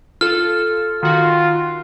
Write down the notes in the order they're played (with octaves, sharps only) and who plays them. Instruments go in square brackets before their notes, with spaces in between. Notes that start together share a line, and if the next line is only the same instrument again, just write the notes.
[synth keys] F4 A4 [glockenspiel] F6
[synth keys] D#3 F#4 [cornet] F4